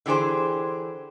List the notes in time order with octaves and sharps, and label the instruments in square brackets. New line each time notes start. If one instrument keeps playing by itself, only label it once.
[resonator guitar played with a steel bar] D3 E3 G4 G#4 C5